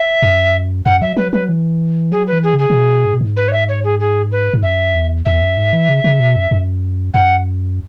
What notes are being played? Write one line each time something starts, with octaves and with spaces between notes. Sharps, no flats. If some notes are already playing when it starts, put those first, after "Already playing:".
Already playing: E5
F#2
F#2 F#5
F#3 E5
F#3 B4
F#3 B4
E3
F#3 G#4
B4
E3
G#4
C#3
G#4
C#3
B2
G#2
B2
G#2
B4
C#5
E5
C#5
G#4
G#4
B4
G#2
F#2 E5
E2
E2 E5
F#2
G#2
E3
C#3
C#3
B2
F#2
F#2
F#2 F#5